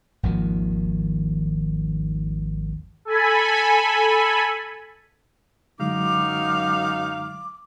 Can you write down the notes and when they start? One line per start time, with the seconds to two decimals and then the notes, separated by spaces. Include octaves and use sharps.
0.23 G#1 D#2 D#3 F3
3.05 A4 G#5 B5
5.80 F#2 D3 F#3 G#3 D#4 F5 D6